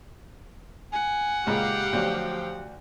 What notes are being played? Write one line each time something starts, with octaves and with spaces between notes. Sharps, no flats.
F#5 G#5
C#2 A#2 G#3 G4 F5 G5
D2 F3 F#3